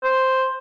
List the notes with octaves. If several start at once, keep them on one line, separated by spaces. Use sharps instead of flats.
C5